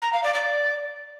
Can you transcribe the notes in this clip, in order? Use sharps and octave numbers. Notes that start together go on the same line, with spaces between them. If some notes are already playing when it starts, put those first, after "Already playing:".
A#5
F5
D5
D5